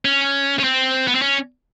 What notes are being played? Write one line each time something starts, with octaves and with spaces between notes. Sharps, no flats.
C#4
C#4
C4
B3
C4
C#4